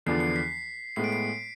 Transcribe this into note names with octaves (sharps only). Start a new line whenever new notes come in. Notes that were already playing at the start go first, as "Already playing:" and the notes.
E2 D3 F3 B3 D4 C7
C7
B6
A2 G#3 B3 C7
D7
C7